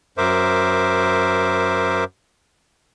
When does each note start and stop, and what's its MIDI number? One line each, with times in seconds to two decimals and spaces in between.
0.18 2.04 42
0.18 2.04 70
0.18 2.04 72
0.18 2.04 76
0.18 2.04 86